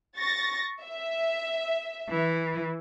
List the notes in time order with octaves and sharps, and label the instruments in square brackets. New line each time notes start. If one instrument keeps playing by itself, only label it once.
[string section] C#6 A6 A#6
E5
[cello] E3